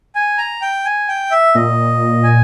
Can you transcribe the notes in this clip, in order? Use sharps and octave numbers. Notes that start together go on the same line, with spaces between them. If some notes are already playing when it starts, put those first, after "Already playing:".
G#5
A#5
G5
G#5
G5
E5
A#2 D#5
G#5